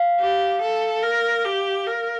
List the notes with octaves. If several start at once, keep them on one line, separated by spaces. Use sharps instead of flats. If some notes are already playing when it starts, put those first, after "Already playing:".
Already playing: F5
G4
A4
A#4
G4
A#4